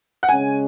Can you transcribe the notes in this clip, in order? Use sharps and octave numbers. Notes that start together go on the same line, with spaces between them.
F#5
C#3 G#3 C#4 G#5